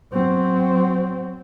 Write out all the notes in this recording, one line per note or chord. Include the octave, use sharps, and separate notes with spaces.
F#3 C4